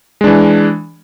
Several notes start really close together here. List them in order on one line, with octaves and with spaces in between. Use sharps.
G#3 D4 E3